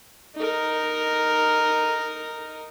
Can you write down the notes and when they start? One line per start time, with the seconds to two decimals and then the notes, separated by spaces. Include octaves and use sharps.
0.36 D#4 A#4